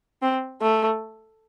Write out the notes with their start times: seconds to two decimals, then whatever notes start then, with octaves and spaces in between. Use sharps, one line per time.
0.22 C4
0.61 A3